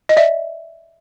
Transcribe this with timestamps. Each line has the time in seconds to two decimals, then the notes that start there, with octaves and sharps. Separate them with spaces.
0.09 D#5
0.17 D5 E5